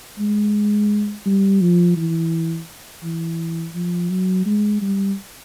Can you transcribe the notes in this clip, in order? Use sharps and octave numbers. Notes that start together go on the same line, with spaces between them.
G#3
G3
F3
E3
E3
F3
F#3
G#3
G3